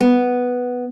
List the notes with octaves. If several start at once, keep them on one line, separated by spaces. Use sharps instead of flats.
B3